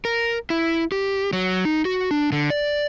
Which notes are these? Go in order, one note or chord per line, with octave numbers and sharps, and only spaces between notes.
A#4
E4
G4
F#3
D#4
F#4
D4
D3
D5